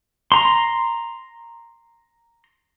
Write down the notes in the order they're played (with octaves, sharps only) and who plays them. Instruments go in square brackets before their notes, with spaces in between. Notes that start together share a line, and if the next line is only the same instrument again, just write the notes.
[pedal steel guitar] A#5 C6